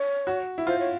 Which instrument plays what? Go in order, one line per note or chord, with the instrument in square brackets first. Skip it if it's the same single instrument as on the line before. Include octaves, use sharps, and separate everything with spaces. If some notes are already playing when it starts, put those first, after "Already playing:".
Already playing: [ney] C#5
[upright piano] F#4
E4
[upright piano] F4 [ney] C5
[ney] C#5